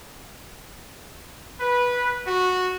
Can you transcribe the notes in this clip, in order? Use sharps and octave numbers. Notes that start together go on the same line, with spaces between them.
B4
F#4